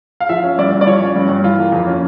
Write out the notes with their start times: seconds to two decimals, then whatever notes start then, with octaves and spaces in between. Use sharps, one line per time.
0.20 F5
0.29 F3 E5
0.43 C#4
0.58 G2 D5
0.73 G2
0.81 D5
0.87 F3 C#5
1.01 C#4
1.16 G2
1.29 G2
1.44 E3 F4
1.59 A#3
1.72 F2
1.87 C#4